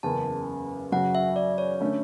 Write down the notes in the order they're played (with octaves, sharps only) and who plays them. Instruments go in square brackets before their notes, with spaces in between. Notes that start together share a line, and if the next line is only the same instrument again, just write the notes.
[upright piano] F#1 E2 C#3 [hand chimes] A5
[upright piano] F#2 C#3 F#3 C#4 F#4 [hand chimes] F#5
[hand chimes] E5
D5
C#5
[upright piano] D3 A3 C#4